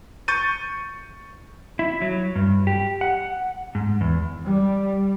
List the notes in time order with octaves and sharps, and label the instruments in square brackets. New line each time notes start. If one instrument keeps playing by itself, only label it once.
[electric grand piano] C#6 G6 A6 D#7
[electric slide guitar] E4
F#3
G2
G4
F#5
G#2
E2
[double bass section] G3